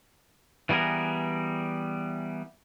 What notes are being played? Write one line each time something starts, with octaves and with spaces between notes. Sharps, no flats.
E3 G3 B3 G#4 A#4